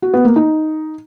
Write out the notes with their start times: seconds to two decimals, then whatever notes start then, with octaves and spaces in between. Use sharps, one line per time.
0.02 F#4
0.14 B3
0.25 A#3
0.36 D#4